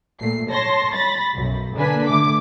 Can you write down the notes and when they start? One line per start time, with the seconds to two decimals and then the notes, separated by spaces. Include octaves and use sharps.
0.20 A#2 A3 C7
0.50 C#5 A5 C6 A#6
0.93 B5 A6 A#6
1.33 B1 F#2
1.76 D3 A#3 D4 B4 G#5 B6
2.07 D3 A3 D6